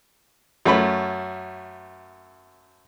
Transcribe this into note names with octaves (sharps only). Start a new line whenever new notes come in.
F#2 A3 C#4 C#5 B5